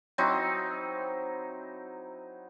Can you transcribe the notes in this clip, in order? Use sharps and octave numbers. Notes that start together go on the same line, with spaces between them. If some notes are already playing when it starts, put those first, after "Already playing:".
F#3 C4 D#4 E4